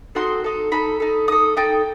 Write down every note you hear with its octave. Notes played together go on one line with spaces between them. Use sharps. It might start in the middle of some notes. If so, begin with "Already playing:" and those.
C4 D#4 F#4 A4 C6
D#4 A4
D#4 A4 B5
D#4 A4
D#4 A4 D#6
D#4 A4 G5